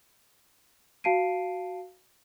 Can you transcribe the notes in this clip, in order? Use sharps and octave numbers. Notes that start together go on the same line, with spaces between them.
F#4 F5 A5 C7 D7 D#7